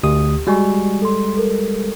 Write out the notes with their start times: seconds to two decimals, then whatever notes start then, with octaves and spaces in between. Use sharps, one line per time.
0.03 D2 G4 D#6
0.47 G3 G#3 F#4 G#5 C#6
1.02 A4 C6
1.37 A4 A#4